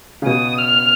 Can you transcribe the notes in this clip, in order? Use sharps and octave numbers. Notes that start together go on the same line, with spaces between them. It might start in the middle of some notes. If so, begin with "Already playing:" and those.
C#3
B2 D#6
F6